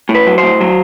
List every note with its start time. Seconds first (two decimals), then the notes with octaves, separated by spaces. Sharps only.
0.09 A2
0.15 B4
0.27 F#3
0.38 C5
0.43 A2
0.60 F#3